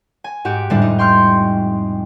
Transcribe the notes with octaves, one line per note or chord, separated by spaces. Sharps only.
G#5
G#2 F#4 G4 D7
F2 A2 D3 G3 G#3 D4
D#4
G5 C6 C#6 F6 G6